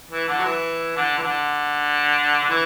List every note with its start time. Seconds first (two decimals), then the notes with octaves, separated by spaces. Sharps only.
0.11 E3
0.28 D3
0.39 F#3
0.45 E3
0.96 D3
1.18 E3
1.22 D3
2.42 D3
2.49 E3